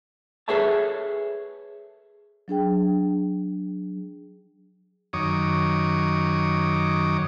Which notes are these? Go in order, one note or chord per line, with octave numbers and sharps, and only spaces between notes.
G#4 A4 B4 C#5 E5 A5
F#3 D4 G#4 G5
F#2 D#3 C#5 D6 D#6